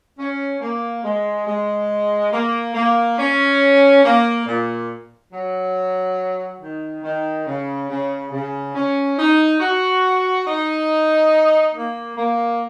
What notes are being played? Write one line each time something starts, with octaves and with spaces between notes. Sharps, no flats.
C#4
A#3
G#3
G#3
A#3
A#3
C#4
A#3
A#2
F#3
D#3
D#3
C#3
C#3
C#3
C#4
D#4
F#4
D#4
A#3
A#3